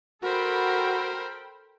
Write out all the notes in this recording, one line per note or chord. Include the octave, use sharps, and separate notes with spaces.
F#4 A4 A#4 C5 G5 B5